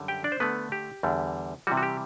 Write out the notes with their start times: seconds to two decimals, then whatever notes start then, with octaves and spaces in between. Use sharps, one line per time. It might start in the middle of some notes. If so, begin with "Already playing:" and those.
Already playing: F#2 D3 G3
0.08 G4 G5
0.24 D4 D5
0.32 C5
0.40 D3 A3 B3 D4 B4
0.72 G4
1.03 E2 D3 G3
1.67 C3 E3 G3 F#4
1.77 F#4
1.83 G4